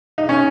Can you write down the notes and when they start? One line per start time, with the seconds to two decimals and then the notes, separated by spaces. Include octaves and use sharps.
0.18 D#4
0.29 C#4